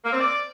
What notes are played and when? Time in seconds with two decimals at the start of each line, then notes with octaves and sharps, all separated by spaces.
0.05 A#3
0.13 C4
0.20 D5